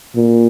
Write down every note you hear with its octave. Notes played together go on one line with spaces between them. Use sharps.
A#2